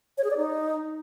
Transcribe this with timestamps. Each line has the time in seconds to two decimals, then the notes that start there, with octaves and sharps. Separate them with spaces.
0.18 C#5
0.24 G#4
0.30 D5
0.37 D#4